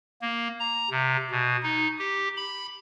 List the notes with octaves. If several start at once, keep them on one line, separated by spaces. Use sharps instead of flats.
A#3
A#5
C3
B2
D#4
G4
B5